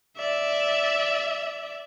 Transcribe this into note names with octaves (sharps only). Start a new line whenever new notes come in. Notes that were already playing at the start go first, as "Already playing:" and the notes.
D5 E5